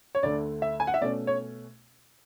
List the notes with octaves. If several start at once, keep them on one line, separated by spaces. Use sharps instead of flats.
C#5
D2 D3 A3 D5
E5
G#5
F#5
E5
B2 A3 C#4 D5
C#5